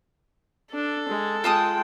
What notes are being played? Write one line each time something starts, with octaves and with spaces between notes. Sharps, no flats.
D4 A4
G#3
G#3 F4 G5 A5 D#6